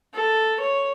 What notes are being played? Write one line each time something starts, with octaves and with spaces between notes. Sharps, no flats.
A4
C#5